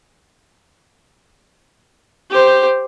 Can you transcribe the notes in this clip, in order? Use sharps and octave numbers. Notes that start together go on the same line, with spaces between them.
G4 C5